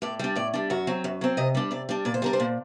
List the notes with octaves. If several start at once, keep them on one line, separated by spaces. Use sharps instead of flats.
A2 D5
G3 D4
A2 D5
G3 D4
F#2 F#4
F#3 C4
F#2
F#3 C4
C3 D#5
G3 D4
C3 D5
G3 D4
A#2 D5
C5
G3 D4 A#4
C5
A#2